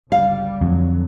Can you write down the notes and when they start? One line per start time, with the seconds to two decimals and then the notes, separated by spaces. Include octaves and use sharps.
0.12 G1 C#2 G3 F5
0.61 F2 A2 D3 F#3